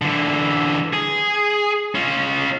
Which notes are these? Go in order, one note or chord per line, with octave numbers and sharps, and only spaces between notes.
D3 E3
G#4
C#4 F4